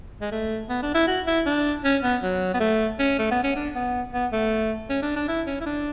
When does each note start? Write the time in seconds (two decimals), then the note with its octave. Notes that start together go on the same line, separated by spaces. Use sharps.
0.21 G#3
0.32 A3
0.69 B3
0.82 D4
0.94 E4
1.07 F#4
1.27 E4
1.46 D4
1.84 C#4
2.03 B3
2.22 F#3
2.54 B3
2.60 A3
2.99 C#4
3.19 A3
3.31 B3
3.43 C#4
3.56 D4
3.75 B3
4.13 B3
4.32 A3
4.89 C#4
5.02 D4
5.16 D4
5.28 E4
5.47 C#4
5.61 E4
5.66 D4